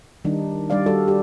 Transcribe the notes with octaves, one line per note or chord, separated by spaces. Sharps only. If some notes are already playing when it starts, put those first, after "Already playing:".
D#3 G3 D4 D#4
G3 D4 D5 F5
G3 F#4 A4
G4